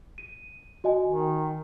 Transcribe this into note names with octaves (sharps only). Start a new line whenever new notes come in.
D#7
F#4 D#5 G#5
D#3